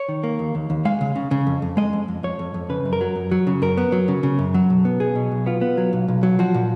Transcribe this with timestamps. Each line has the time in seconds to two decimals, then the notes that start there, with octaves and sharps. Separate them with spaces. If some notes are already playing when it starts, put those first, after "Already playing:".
Already playing: C#5
0.09 D#3
0.23 A#3
0.39 D#2
0.55 D#2
0.70 D#2
0.85 G#3 F5
1.01 C#3
1.15 C#3
1.31 C#3
1.47 F2
1.62 F2
1.77 G#3 D#5
1.93 F2
2.08 F2
2.23 F2 C#5
2.39 F2
2.54 F2
2.69 C#3 B4
2.85 F#2
2.93 A#4
3.01 F#3
3.16 F#2
3.31 F#3
3.47 C#3
3.62 F#2 A#4
3.77 B3
3.92 F#3
4.08 C#3
4.23 C#3
4.39 F#2
4.54 F#3
4.70 B1
4.85 B3
5.00 B1 G#4
5.15 B2
5.32 B1
5.46 B3 F4
5.61 B3
5.77 F#3
5.93 B1
6.08 B1
6.23 F#3
6.39 F3 F#4
6.54 A#2